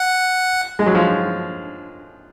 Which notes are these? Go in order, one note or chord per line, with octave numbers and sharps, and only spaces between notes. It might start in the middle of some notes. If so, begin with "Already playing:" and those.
Already playing: F#5
G#3
F#3
F3